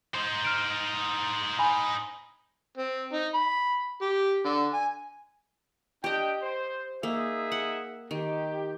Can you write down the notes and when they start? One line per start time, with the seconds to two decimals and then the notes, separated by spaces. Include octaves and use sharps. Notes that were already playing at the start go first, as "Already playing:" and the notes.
0.14 D#4 C5
0.45 F6 D7
1.59 G#5 B5
2.77 C4
3.12 D#4
3.34 B5
4.01 G4
4.45 D3
4.73 G#5
6.04 D4 G4 D#5 G5
6.43 C5
7.03 A#3 D#4 G#4 E5
7.52 F#5
8.11 D#3 G4